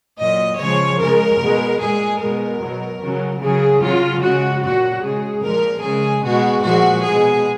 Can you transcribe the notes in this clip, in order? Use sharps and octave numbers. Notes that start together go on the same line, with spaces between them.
A#2 F#3 D#5
C#3 F3 G#3 C#5
C#3 G#3 A#4
B2 G#3
A#2 G#3 G#4
B2 G#3 A#4
B2 F#3
C#3 F#3
C#3 F#3 G#4
C#3 F#3 F4
C#3 G#3 F#4
A#2 F#3 F#4
C#3 G#3 G#4
A#2 F3 G#3 A#4
C#3 G#3 G#4
B2 G#3 F#4
A#2 F3 G#3 F#4
B2 G#3 G#4